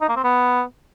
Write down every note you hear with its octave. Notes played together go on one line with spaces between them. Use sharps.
D#4
A#3
C4
B3